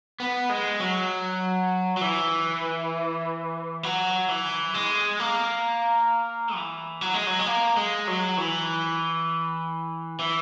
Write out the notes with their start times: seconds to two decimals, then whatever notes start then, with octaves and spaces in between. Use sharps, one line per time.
0.20 B3
0.50 G#3
0.80 F#3
1.97 F#3
2.01 E3
3.83 F#3
4.28 E3
4.74 G#3
5.20 A#3
6.56 E3
7.01 F#3
7.14 G#3
7.27 F#3
7.39 G#3
7.46 A#3
7.77 G#3
8.08 F#3
8.38 E3
10.19 E3